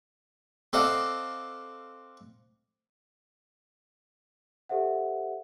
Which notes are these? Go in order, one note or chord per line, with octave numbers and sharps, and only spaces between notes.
C4 A4 D5 D#5 F5 F#5
G4 A4 C5 E5 F#5